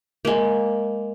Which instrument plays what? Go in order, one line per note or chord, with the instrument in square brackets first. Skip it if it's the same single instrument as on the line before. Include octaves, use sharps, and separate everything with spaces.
[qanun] G#3 A#3